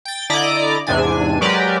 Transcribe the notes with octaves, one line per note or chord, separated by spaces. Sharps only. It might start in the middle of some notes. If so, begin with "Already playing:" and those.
G5 A6
D3 E4 D5 D#5 A#5 D6
E2 G#2 C3 D4 G#5
F#3 G#3 G4 A#4 B4 D5